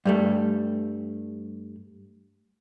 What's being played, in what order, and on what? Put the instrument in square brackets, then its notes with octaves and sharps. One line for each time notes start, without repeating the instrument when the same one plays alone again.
[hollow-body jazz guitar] G2 G3 A3